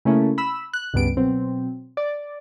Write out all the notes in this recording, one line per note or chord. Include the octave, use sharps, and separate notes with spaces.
C#3 A3 A#3 C#4 E4
B5 E6
F#6
C#2 G2 G3 B3 D7
B2 F#3 C4
D5